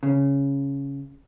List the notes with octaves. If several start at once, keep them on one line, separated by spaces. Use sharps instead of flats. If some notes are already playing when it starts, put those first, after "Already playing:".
C#3